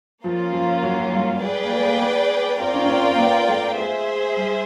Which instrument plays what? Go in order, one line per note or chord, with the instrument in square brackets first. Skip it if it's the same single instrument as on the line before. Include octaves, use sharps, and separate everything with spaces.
[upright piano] F3 [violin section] A#3 C#4 F4
[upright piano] F3
F#3
F#3
G3
[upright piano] G#3 [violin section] G#4 B4 D5 G5
[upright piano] A#3
A3
A#3
B3
[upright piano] C4 [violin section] F4 A#4 D5 G5
[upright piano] C#4
C#4
C4
A#3
B3
A3
[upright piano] G#3 [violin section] G#4 C5 E5
[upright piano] G3